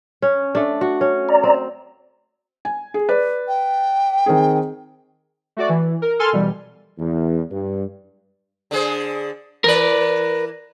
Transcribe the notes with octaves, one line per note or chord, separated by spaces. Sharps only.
C#4
A3 D4
F#4
C#4
D5 A#5
C4
G#5
G#4
B4 D5
G5
D#3 C4 G#4
A3 F#4 D5
E3
A#4
A4 G#5 C6 F6
B2 E3 G3
E2
G2
D3 G#4 C5
E3 A#4 B4 D5